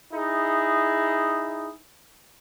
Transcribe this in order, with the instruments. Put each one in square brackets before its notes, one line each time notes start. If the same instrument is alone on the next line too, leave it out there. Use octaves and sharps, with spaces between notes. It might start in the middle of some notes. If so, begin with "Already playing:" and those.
[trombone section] D#4 E4 G#4